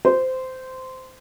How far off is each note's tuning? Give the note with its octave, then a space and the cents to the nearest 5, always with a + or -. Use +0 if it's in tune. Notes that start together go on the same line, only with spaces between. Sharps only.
C5 -15